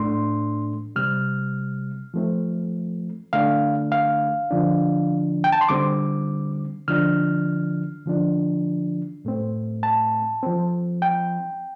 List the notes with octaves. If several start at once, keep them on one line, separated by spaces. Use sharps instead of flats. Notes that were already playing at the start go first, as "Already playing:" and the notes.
Already playing: A2 A3 D4 C6
C3 G3 C4 F6
F3 A3 C4
D3 A3 D4 F5
F5
D3 F3 D4
G5
A5
C6
D3 G3 C4 D6
D3 F3 D4 F6
D3 F3 D4
A2 A3 C4
A5
F3 C4
G5